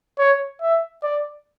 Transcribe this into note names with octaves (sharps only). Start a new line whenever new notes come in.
C#5
E5
D5